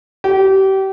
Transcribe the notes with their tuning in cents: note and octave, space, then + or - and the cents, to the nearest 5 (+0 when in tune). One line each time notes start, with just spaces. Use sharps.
G4 -30